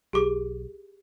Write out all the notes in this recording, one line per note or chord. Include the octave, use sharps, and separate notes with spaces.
B1 G4 G#4 D6